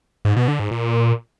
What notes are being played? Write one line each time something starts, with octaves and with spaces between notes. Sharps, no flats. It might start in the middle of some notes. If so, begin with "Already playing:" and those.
G#2
B2
D3
G#2
A#2